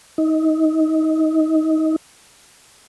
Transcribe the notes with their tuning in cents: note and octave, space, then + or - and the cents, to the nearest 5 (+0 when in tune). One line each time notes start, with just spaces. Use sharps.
D#4 +25